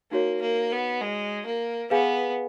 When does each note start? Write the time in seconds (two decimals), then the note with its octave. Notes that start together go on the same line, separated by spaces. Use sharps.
0.11 A#3 D#4 F#4 C#5
0.41 A#3
0.72 B3
1.01 G#3
1.46 A#3
1.90 B3 G#4 B4 F5 G#5